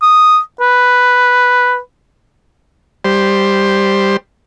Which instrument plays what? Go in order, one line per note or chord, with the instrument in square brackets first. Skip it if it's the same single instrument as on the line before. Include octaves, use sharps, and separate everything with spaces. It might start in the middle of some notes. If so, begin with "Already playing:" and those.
[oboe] D#6
B4
[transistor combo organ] G3 C5